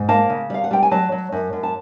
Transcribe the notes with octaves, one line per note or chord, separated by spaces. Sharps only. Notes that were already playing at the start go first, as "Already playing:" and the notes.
Already playing: G#2
A#3 A5
C#3
G3 F5
F#5
G3 G5
G#5
F#3 A5
F#3
F#2
F#2
A5